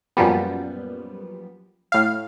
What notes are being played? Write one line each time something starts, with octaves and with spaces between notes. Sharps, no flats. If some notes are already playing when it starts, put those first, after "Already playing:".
F#2 A#2 F3 G3 B3
A2 F5